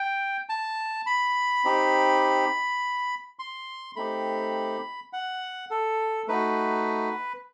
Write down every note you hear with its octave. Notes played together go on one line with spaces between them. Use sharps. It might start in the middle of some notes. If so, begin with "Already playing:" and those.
Already playing: G5
A5
B5
C4 D#4 G4
C6
A3 C4 D#4 G4 B5
F#5
A4
A3 D#4 F#4 B4